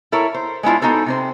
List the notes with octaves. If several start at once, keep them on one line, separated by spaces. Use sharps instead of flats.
E4 A4 A#4 C#5
C5
G#3 B3 D4 E4 F4
B3 D#4 F#4 A4 C5
C3 C4 C5